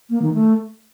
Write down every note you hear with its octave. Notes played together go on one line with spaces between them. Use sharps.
A#3
D#3
A3